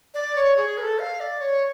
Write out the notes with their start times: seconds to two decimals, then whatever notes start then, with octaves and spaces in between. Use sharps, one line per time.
0.14 D5
0.36 C#5
0.57 G#4
0.77 B4
0.82 A4
0.99 F5
1.20 D5
1.41 C#5